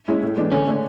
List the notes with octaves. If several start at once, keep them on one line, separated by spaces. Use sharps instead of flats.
G#3 C#4 E4
A2
E3 G#3 B3 D4
D3 C#4
A3 D4